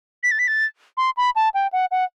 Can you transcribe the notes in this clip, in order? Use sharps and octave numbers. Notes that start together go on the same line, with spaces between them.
B6
A6
B6
A6
C6
B5
A5
G5
F#5
F#5